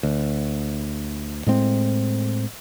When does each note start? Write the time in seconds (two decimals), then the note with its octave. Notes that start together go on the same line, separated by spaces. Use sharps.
0.03 D2
1.46 A2 G#3 C4